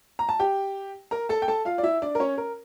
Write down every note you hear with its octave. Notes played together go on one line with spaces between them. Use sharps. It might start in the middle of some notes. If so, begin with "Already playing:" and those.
A#5
A5
G4 G5
A#4 A#5
A4 A5
G5
A4 A5
F4 F5
D5
E4 E5
D4 D5
A#4
C#4 C#5
A#4